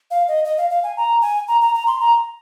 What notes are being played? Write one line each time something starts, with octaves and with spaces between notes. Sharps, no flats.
F5
D#5
D#5
F5
F5
G#5
A#5
G#5
A#5
A#5
A#5
C6
A#5